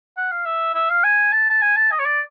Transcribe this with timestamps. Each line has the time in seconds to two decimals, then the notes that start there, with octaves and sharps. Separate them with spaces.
0.17 F#5
0.32 F5
0.45 E5
0.75 E5
0.90 F5
1.04 G#5
1.33 A5
1.50 A5
1.62 G#5
1.76 A5
1.91 D#5
1.99 C#5
2.06 D5